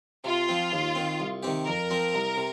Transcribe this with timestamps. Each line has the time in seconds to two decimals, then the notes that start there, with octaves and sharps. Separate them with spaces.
0.24 C3 F4
0.49 F3 C4
0.72 D#2
0.95 D#3 C4
1.20 C2
1.43 C3 D#3 C4 G4
1.67 F2 A#4
1.90 F3 C4
2.14 C2
2.37 C3